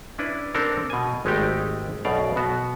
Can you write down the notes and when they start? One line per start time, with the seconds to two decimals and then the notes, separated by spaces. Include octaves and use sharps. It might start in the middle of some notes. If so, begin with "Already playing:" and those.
0.18 C#4 D4 E4 B4
0.55 C4 D4 A4 A#4
0.90 B2 G#5
1.25 G#1 G#3 A3 D#4 G4 G5
2.05 B1 F#2 B2 D5 F5
2.36 B2 B3 F#4